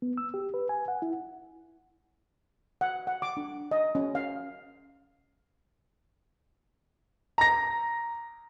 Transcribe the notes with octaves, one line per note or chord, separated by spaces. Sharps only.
B3
E6
G4
B4
G#5
F#5
E4
F#5
F#5
D6
D4
D#5
C#4
F5
A#5 A#6